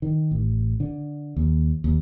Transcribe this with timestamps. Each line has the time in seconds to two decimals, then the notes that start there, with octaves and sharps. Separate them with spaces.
0.02 D#3
0.31 A1
0.80 D3
1.36 D#2
1.84 D#2